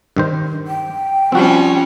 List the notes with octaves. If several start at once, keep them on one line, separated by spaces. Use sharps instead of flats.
G2 D#3 C5
G5
F3 G3 C4 C#4 F#4